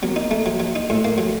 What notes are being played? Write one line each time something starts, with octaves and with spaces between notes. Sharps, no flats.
F#3 A#3
D#4
A3
F#3
F#3
D#4
A2 A3
A#3
F#3